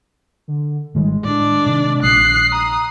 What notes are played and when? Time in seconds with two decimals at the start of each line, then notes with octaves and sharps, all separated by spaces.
0.48 D3
0.95 G#1 D#3 G3 G#3
1.24 A2 D4 D5
1.66 C3 D#3
2.03 A#1 D#6 F#6 C7
2.52 A#5 D#6